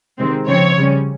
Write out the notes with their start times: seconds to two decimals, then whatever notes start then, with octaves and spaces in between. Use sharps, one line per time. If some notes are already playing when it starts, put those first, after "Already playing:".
0.19 C3 D#3 G#3 C4
0.47 C#3 F3 C4 C#5
0.76 C#3 G3 C#4